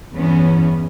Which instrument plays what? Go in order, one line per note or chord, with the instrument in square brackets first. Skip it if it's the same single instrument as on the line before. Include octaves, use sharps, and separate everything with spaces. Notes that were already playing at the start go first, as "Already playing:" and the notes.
[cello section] E2 G2 E3 B3 C#4